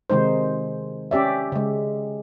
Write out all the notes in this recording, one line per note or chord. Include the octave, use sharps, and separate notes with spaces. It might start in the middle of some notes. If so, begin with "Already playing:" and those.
C3 D#3 G#3 D#4 C5
C#4 G4 D5 E5
C#3 G#3